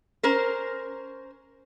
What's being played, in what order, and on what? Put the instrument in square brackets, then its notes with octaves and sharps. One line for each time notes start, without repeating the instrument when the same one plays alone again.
[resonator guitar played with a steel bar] C#4 A#4 C5